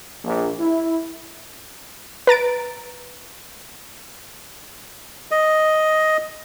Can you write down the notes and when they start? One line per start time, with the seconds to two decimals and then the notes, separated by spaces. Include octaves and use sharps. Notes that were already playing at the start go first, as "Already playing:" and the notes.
0.24 A#1
0.59 E4
2.27 B4 A#5 A6 D7
5.31 D#5